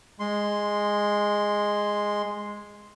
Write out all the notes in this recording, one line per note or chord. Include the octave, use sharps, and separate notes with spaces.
G#3 C6